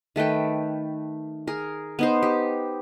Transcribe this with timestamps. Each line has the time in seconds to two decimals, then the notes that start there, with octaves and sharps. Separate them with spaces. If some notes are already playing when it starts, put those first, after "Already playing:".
0.16 D#3 A3 B4 G5
1.47 G#4 A#4
1.99 B3 D#4 C5
2.23 G4